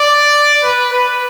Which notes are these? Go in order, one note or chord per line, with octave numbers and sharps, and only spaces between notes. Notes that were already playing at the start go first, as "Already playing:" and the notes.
Already playing: D5
B4
B4